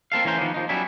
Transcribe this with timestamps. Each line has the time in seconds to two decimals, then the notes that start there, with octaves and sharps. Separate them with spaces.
0.12 A#3 C4 A4 F5
0.25 E3 A3 C#4 A#4 C5
0.38 D#3 F3 A#3 B3
0.54 D#2 F3 D#4
0.69 F#3 G3 B3 C#4 E4